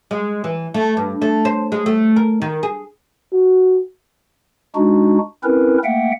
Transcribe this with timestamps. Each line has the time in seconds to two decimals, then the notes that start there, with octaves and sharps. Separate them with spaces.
0.11 G#3
0.44 E3
0.74 A3
0.97 G2
1.22 A3
1.45 C5
1.72 G#3
1.86 A3
2.16 A#4
2.42 D#3
2.63 G#4
3.33 F#4
4.75 G#3 D4 D#4 F#4
5.44 C4 C#4 E4 A#4 B4
5.84 A3 A#3 E5 F#5 G5